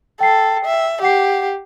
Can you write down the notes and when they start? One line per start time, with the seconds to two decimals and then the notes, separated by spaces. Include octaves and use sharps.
0.20 A4 G5 C7
0.65 E5
1.02 G4 F#5 C7